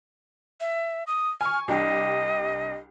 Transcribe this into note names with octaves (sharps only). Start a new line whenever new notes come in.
E5
D#6
G#5 C#6 F6
C2 D4 G4 D#5